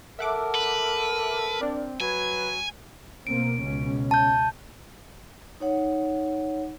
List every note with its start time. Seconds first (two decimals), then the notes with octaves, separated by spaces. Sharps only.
0.19 A4 A#4 E5 F#5 D6
0.55 B4
1.61 C4 D4 D5
2.00 F#3 B4 G#5 G#6
3.27 B2 A#3 C4 D7
3.60 C#2 B2 C#4
4.11 A5 G6
5.60 D#4 C#5 F#5